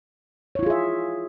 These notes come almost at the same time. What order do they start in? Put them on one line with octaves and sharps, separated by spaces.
C#5 E4 F4 G#4 E5